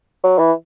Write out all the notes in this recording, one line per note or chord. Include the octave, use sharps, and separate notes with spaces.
F#3
E3